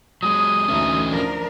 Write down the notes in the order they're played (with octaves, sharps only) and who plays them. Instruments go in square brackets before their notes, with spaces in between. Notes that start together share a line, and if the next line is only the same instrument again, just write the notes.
[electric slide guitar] F#3 G#3 [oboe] D#6
[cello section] D2 E3 D#4 [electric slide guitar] C#4 A4 E5
[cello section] F3 D4 A#4